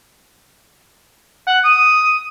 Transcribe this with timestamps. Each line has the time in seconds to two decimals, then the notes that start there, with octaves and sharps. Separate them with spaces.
1.47 F#5
1.64 D#6